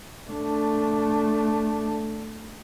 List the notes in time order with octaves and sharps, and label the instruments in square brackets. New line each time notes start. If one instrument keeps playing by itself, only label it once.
[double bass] A3 D4